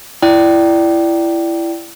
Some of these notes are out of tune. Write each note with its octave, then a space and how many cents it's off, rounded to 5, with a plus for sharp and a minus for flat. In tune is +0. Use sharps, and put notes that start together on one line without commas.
E4 +25 D5 +0 G5 -25